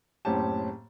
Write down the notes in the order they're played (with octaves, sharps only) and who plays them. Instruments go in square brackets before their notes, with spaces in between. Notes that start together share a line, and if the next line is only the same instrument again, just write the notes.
[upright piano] F#1 A2 C4 C#4 G4 A5